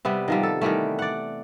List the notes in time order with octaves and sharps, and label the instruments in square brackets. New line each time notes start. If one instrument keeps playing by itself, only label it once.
[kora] C3 G3 B3
D#3 F3 G3
A4
D#3 E3 G3 A3
D5 F#5